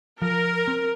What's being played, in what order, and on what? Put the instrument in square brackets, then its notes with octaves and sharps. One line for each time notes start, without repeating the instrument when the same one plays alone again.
[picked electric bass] F3 [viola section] A#4
[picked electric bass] C4